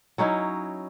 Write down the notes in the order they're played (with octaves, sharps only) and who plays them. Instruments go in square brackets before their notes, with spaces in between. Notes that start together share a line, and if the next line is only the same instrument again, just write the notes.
[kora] F#3 C#4 D#4 E4